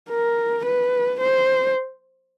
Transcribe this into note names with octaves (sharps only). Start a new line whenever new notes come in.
A#4
B4
C5